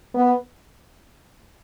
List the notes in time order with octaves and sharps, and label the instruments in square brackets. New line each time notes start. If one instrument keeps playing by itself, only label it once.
[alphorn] B3